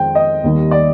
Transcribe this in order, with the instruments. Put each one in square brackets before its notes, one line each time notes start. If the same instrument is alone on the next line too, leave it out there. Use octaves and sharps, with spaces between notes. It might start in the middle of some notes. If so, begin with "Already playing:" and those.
Already playing: [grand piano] F2 D#3 G#3 C4 F4 G5
D#5
D#2 D#3 G3
D5